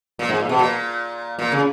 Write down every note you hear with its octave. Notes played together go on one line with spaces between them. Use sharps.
A#2
G#2
A#2
B2
A#2
A#2
C#3